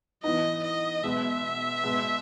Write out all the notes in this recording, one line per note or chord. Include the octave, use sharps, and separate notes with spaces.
E3 B3 D#4 D#5
D#5
B2 G#3 B3 E5
B2 G#3 B3